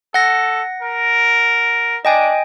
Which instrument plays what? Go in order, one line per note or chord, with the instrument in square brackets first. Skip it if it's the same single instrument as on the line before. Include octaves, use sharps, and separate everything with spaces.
[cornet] A4 [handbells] F#5 A#6
[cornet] A#4
[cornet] D4 [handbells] D#5 G5 G#5